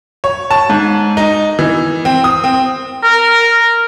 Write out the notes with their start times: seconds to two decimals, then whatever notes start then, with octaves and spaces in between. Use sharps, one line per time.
0.24 C#5
0.51 A5
0.70 G#2
1.17 D#4
1.59 E3
2.05 C4
2.24 D#6
2.44 C4
3.04 A#4